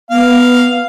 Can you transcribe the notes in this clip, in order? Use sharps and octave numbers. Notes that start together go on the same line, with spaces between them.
B3 F5